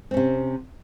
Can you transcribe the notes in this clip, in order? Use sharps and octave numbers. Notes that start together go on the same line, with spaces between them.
C3 C4 C#4